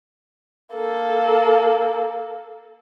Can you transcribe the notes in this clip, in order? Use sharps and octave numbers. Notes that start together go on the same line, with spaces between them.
A#3 A4